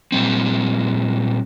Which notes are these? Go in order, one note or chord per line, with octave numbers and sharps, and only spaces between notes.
A#2 G3 C4